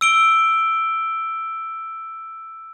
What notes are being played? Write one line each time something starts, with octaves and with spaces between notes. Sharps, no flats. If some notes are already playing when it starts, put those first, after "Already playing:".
E6 D7 G7